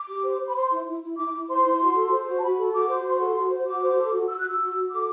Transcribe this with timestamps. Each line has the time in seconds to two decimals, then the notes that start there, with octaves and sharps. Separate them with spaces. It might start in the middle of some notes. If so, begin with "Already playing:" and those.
Already playing: D6
0.09 G4
0.24 C5
0.41 C5
0.47 B5
0.56 C5 C6
0.71 E4
0.87 E4
1.02 E4
1.17 E4 D6
1.33 E4
1.49 C5 C6
1.64 E4
1.80 F#4
1.95 A4
2.10 C5
2.27 F#4
2.38 A5
2.42 F#4 B5
2.58 A4
2.73 F#4 D6
2.88 C5
3.04 F#4 C6
3.20 A4
3.36 F#4
3.50 C5
3.66 F#4 D6
3.82 C5
3.97 A4
4.12 F#4
4.28 F#4 E6
4.39 F#6
4.44 F#4
4.49 E6
4.60 F#4
4.75 F#4
4.91 A4 D6